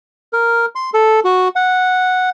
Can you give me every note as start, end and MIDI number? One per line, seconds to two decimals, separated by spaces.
0.33 0.66 70
0.75 0.90 84
0.94 1.20 69
1.25 1.48 66
1.56 2.30 78